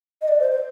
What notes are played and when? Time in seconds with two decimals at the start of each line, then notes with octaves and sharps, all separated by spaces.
0.22 D#5
0.28 D5
0.40 C5
0.51 C5